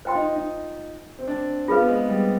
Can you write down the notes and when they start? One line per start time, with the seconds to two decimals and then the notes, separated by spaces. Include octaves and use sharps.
0.05 F4 C5 G5 C6
0.15 D#4
0.36 D#4
1.19 C4
1.27 D4
1.68 C4 F4 G#4 B4 F5
1.78 B3
1.88 G#3
2.09 G3